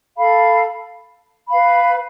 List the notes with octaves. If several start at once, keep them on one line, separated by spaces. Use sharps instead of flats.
A4 F5 B5
B4 F5 B5